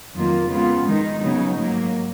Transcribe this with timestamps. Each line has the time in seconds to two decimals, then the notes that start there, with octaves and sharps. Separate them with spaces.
0.13 F2 D#3 F#3 A#3 F4
0.48 C#3 G#3 B3 F4
0.85 D#3 G#3 D#4
1.19 C#3 F#3 B3 D#4
1.54 G#2 F#3 A#3